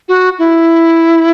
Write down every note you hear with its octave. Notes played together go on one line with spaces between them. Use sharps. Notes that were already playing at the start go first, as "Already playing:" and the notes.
F#4
E4